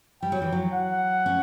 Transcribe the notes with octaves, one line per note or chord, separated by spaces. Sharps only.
G3 G5
F#3
E3
F#3
F#5
C#4